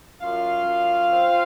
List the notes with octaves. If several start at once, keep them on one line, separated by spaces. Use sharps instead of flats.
F#2 F4 F5
F#2
C4